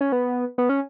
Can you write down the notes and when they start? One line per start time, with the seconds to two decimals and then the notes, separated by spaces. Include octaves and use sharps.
0.01 C#4
0.12 B3
0.58 B3
0.69 C#4